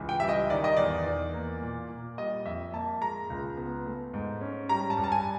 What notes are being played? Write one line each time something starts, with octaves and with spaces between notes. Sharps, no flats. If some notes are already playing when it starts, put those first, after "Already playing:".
Already playing: C#2 E3
G5
G3 E5
D#5
D#3 D5
D#5
E2 D5
E2
A#3
A#2
A#2
G3 D#5
F2 E5
A#3 A5
G#3 A#5
C#2
B3
A3
G#2
C#4
G3 A#5
A5
G2
A5
G#5